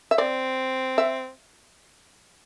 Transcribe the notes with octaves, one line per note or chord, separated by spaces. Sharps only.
E5
C4 D5
E5